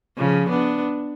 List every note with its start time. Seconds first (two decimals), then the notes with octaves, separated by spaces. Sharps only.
0.18 C#3 F3
0.49 B3 D4